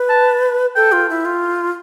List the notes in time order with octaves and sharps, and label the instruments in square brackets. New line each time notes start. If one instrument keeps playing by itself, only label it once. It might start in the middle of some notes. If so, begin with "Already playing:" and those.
Already playing: [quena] B4
[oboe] A5
[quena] A4 [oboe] G5
[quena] F4
E4
F4